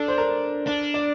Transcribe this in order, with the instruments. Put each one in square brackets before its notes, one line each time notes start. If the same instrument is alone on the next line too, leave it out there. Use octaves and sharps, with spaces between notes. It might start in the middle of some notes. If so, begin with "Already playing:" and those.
Already playing: [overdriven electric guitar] D4 [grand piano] A4
[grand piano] C5
A#4
[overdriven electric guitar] D4
[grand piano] D5